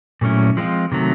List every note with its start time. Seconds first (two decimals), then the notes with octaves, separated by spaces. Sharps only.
0.21 A#2 F#3 A3 C#4 E4
0.57 F3 G#3 C4 F4
0.92 C3 D#3 F#3 A3